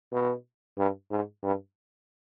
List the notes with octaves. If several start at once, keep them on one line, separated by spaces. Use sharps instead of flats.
B2
G2
G#2
G2